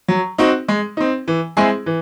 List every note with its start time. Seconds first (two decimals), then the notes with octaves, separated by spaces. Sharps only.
0.08 F#3
0.38 C4 D#4 F#4
0.68 G#3
0.97 C4 D#4
1.28 E3
1.57 G#3 C4 E4 G#4
1.86 E3